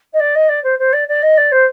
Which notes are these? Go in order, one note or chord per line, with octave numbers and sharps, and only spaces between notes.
D#5
D5
D#5
D5
C5
C5
D5
D5
D#5
D5
C5